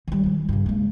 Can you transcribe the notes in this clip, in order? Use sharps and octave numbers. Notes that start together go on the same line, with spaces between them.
D#3 G3
D#3 F3
G2 C#3
G#3 A#3